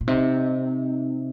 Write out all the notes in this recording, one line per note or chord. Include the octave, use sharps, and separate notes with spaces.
A#2
C3 C4 D#4